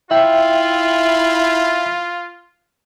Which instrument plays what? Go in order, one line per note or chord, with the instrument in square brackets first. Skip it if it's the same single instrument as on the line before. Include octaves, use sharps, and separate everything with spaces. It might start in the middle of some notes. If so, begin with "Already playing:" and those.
[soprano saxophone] E4 [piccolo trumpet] F4 [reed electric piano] E5 G5